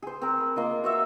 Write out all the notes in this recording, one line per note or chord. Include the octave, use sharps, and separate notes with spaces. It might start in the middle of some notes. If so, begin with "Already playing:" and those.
G#4 C5
C4 A#4
B5
A#3 F4 D#5
F#4 C#5 E5